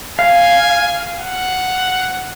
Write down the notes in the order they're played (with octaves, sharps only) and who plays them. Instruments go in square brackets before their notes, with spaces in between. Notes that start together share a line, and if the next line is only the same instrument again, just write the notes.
[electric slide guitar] F5 [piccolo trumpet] G#5
[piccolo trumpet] F#5